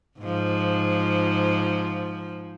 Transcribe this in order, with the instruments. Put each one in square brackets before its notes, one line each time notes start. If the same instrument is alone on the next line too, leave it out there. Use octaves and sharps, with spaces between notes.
[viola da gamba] G#2 F3